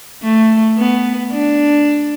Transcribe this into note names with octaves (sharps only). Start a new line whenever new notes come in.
A3
B3
D4